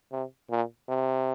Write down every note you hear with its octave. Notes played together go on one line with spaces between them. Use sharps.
C3
A#2
C3